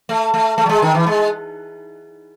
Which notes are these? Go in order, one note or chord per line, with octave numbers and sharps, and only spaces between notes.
A3
A3
A3
F#3
G#3
D#3
E3
G#3